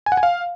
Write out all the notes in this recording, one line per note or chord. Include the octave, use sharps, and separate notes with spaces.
G#5
F#5
G#5
F5